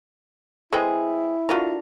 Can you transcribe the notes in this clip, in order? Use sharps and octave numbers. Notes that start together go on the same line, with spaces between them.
G#3 C4 E4 G#4 A4 B4 G5
D3 F4 F#4 A#4 A#5